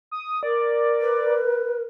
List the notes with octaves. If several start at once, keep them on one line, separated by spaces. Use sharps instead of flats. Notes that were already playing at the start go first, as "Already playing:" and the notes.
D#6
A#4 D5
B4